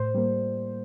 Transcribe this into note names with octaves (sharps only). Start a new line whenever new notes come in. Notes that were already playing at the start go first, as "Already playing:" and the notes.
Already playing: A2 C5
G3 A#3